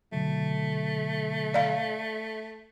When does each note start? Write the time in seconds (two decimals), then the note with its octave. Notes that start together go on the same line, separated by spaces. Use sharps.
0.12 B2 D3 F#3 A3
1.54 D5 F5